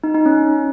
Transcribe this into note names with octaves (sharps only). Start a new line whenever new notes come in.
D#4
D#4
C#4